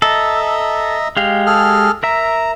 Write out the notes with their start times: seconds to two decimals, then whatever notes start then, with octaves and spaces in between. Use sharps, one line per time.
0.02 A4 D#5 E5 A#5
1.17 G#3 G4 F5
1.46 G#4 A4 F6
2.03 A#4 E5 A#5